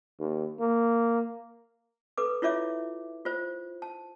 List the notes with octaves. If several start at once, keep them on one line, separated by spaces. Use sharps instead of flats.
D#2
A#3
A4 B4 D6
E4 F4 C#5 E5 D6
F4 C5
A5